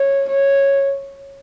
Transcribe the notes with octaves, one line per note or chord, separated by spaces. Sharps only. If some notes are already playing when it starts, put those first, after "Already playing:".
Already playing: C#5
C#5